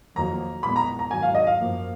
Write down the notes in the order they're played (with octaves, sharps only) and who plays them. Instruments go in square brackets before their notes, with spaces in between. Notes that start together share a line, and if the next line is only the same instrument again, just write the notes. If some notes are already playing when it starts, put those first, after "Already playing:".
[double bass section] F2 D#3 F#3 A#3 [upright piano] A#5
[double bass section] A#2 G#3 B3 [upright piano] B5
[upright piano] A#5
A#5
[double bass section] G#2 D#3 F#3 [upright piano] G#5
[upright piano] F5
D#5
F5
[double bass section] F#2 F3 A#3